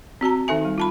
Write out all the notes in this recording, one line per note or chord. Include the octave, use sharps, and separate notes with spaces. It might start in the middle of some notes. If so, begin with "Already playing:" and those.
C4 F#4 A5 A#5
D#3 D#4 A4 E5 G#5
G3
F4 A5 B5